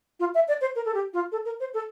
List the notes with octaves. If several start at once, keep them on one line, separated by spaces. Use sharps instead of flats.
F4
E5
D5
C5
A#4
A4
G4
F4
A4
A#4
C5
A4